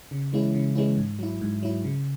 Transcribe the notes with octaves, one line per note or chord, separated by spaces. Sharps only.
C#3
E3 G#3 C#4 E4
C#3
E3 G#3 C#4 E4
G#2
F#3 E4
G#2
F#3 E4
C#3